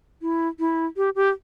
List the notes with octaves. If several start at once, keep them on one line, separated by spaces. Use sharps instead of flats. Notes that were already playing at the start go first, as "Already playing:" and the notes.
E4
E4
G4
G4